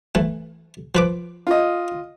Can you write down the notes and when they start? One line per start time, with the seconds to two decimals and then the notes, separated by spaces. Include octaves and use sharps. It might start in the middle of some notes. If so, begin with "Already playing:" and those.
0.15 E3 A3
0.95 F3 B4 D6
1.47 F4 D#5